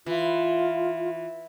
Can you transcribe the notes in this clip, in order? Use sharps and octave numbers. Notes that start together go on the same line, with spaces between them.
E3 F4